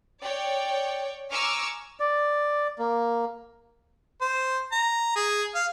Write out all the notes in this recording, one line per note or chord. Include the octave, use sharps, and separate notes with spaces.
C#5 D5 G5
G#5 A#5 C#6 D6 E6 F6
D5
A#3
C5
A#5
G#4
F5